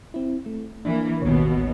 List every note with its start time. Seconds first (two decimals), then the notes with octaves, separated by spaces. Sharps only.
0.14 C4 E4
0.46 A3
0.85 E3 A#3 D4
1.22 A1 D#2 B2 B3 C#5